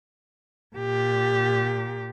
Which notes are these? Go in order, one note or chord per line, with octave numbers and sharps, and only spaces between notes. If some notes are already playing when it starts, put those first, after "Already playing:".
A#2 G4